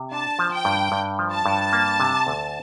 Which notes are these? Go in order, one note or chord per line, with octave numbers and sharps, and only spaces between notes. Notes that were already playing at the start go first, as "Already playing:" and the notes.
Already playing: C3
D4 A5
F3
G5
G2
G2
F3
A5
G2
A#3
C3
D2